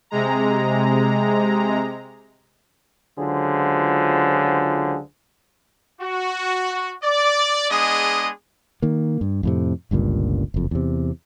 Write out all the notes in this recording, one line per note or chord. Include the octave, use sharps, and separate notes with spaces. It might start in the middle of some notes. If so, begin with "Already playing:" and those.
C3 G#3 A#5
C#2 D3 F#3 F4 G#4 C5
F#4
D5
G#3 B3 D4 G#4 D#5 D#6
D#3 A#3
G2
F2 A2 C3
G1 C#2 G2 A#2
F#1 F2
E2 C3